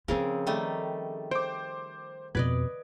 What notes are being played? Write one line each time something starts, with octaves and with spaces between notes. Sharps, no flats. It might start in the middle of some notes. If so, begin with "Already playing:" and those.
C#3 F3 C4 C#4 G#4 A#4
D#3 G3 A3
C5 G5 D6
F2 B2 B4 D5 D#5 G#6